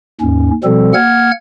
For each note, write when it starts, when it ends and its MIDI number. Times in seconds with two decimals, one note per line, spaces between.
0.21 0.50 39
0.21 0.50 44
0.21 0.50 61
0.64 0.93 47
0.64 0.93 53
0.64 0.93 55
0.64 0.93 60
0.64 0.93 69
0.94 1.31 58
0.94 1.31 78
0.94 1.31 89
0.94 1.31 92